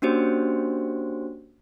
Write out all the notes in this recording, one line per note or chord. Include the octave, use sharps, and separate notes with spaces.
A#3 C#4 D4 F#4 G4 C5